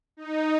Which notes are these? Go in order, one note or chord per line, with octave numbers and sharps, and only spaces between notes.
D#4